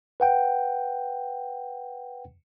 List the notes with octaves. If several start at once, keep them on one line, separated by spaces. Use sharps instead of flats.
B4 F#5 G5